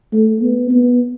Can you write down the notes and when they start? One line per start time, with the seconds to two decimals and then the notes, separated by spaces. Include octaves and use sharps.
0.13 A3
0.41 B3
0.71 B3